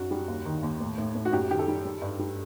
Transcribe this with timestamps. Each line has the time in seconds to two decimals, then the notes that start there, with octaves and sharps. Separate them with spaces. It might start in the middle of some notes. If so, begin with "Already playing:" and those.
Already playing: F#2 F#4
0.11 G3
0.28 D#2
0.45 D#3
0.63 D#2
0.80 A2
0.98 A2
1.15 A2
1.25 F#4
1.32 F#2 G4
1.50 D#3 G4
1.59 A4
1.68 G3
1.85 G3
2.02 G2
2.19 G3